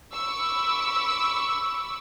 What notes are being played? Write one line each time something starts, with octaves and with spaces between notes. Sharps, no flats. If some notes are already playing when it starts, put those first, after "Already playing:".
B5 C#6 D6 E6